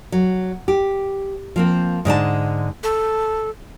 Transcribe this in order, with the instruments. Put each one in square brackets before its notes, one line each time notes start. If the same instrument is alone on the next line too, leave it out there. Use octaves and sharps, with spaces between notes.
[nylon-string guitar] F#3
G4
F3 A#3 C4
G#2 D3 G#3 A5
[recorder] A4